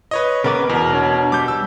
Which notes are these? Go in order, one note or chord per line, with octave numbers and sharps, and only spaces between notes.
B4 C#5 D#5
C#3 B3 A#4 B4 D6
E2 B2 A#4
D4 C#5
G3 D6 G6
E6